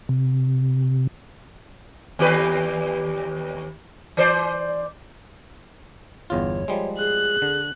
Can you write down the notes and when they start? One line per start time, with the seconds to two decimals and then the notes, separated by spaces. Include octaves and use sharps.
0.09 C3
2.19 D#2 G4 B4
4.17 E3 C5 D5
6.30 G1 E2 F4 C#5
6.68 F3 G3 G#3
6.98 G#4 F#6
7.42 D3